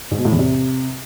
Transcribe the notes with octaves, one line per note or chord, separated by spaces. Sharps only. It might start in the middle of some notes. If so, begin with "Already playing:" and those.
G#2
B2
A2
E2
C3